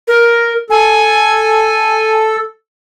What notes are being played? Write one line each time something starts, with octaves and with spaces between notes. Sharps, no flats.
A#4
A4 G#5